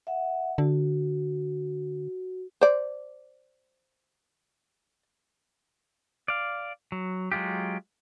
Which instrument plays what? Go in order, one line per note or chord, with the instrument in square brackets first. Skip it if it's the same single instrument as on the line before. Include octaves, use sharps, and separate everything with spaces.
[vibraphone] E5 F#5
[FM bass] D3 [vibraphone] F#4
[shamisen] C5 D5
[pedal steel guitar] D5 F5
F#3
F#3 G#3 F4 G4